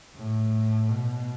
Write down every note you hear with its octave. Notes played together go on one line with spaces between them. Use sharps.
A2
B2